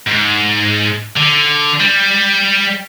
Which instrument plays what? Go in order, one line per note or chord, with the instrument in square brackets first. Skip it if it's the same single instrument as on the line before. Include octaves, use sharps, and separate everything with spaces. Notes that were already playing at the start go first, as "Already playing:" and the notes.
[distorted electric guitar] G#2
D3
G3